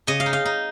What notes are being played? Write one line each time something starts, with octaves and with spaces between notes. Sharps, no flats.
C#3 D#5
F5
D#4
F5
D#4